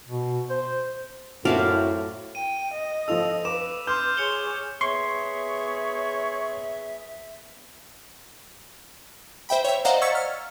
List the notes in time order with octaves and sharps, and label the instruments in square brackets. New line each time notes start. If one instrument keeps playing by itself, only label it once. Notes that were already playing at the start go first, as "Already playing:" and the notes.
[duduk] B2
C5
[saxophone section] F#2 [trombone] A2 [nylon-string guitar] C4 E4 F#4 [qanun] D5 F5 A5
[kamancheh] G5 [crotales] D#7
[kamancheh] D#5
[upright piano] F3 F4 A4 [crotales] E6 F7
[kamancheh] B4 [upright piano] D6 [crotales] E7
[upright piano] C6 [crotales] D6 F6 G6
[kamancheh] G#4 C#5 [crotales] C#7 F7 G7
[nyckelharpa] B3 G#4 [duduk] C#5 [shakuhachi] E5 [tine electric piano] C6 C#6
[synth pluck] C5 E5 G5 B5
C#5 E5
C5 D5 D#5 F5 F#5 A#5
C#6 E6 G#6 A6 B6 C#7
F6